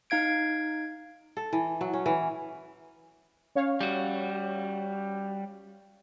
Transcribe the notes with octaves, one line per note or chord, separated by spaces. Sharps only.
D#4 F5 G#6 D7
A4
E3
F#3
C#4
E3
C#4 C#5 F5
G3 F#4